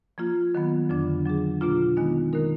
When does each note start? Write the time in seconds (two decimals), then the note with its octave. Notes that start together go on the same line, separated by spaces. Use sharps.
0.18 F3 A#3 F4
0.55 D#3 F#3 B3
0.89 F2 D3 F#3 D4
1.25 F#3 D4 G#4
1.61 B2 A#3 D4 F4
1.97 D#3 G#3 B3 D#4
2.33 D#3 A#3 D#4 A#4